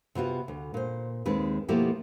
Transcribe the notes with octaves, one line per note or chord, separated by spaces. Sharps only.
C3 B3 F4 F#4
D2
A#2 C5
D#2 D#3 G#3 C4 B4
B2 F3 A3 A#3 E4 G4